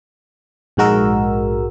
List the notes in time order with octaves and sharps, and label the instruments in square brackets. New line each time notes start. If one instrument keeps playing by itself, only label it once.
[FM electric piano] A#1 G#2 G#3 F#4 A#4 E6